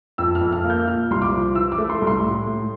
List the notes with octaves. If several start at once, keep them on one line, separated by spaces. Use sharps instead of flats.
F2 E6
F6
F2
F6
A#3
G6
A#2 F6
C2 C6
D6
F3
E3 E6
D6
A3
C6
C2
C6
A2
A2